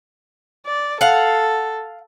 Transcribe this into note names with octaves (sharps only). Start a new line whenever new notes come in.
D5
A4 F5 F#5